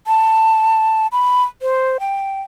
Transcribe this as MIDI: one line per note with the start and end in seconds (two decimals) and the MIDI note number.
0.07 1.07 81
1.12 1.44 83
1.62 1.97 72
2.00 2.41 79